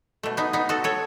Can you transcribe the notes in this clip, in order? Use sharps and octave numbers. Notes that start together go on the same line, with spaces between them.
B2 A3
B3 D#4
B3 D#4
F#4 A4
A4 C#5